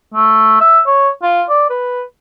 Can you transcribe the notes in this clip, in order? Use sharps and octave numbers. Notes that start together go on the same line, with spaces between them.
A3
E5
C#5
F4
D5
B4